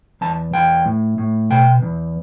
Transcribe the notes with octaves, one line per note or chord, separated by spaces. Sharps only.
E2 A5
E2 G5
A2
A2
B2 G5
E2